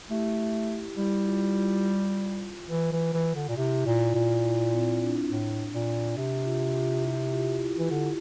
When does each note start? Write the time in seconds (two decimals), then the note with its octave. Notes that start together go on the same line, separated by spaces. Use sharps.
0.10 A3 E4 G4
0.97 G3 E4 G4
1.26 F4
1.55 F4
2.70 E3
2.93 E3
3.13 E3
3.36 D3
3.49 A#2
3.57 C3 E4
3.86 A#2 F4
4.14 A#2 F4
4.44 E4
4.72 C4
5.02 D4
5.30 A2
5.74 A#2
6.17 C3
6.45 F4
6.75 F4
7.03 E4 G4
7.32 F4
7.61 E4
7.78 E3
7.89 D3 E4 G4